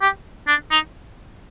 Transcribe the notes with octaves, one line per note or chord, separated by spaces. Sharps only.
G4
D4
D#4